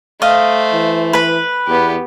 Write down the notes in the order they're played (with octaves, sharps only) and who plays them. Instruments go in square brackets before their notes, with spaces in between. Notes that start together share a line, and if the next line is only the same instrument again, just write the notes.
[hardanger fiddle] A3 C5 [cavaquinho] D#5 F5
[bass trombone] E3
[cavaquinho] B4 B5
[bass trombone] E2 [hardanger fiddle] B3 G4